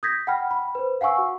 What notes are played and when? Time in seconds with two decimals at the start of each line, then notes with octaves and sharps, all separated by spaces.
0.03 D#6 G6 G#6 A#6 B6
0.27 F#5 G5 B5 F6
0.51 B5
0.75 B4 C5
1.01 F5 F#5 G#5 C#6 E6
1.18 F#4